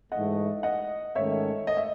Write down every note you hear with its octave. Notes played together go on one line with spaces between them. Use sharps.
G#2 E3 A3 D#5 F#5
D#5 F#5
G#2 D#3 A3 C#4 C#5 E5
D#5
E5